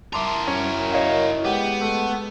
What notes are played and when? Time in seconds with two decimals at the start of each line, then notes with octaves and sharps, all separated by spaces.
0.13 E4 A#4 A5 C6 D6
0.48 F#2 C#4
0.92 C#5 D#5 F5
1.45 G#3 B3 G4
1.81 A3